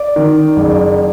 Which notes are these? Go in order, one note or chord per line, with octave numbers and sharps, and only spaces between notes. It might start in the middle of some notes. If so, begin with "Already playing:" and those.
Already playing: D5
D#3
F#1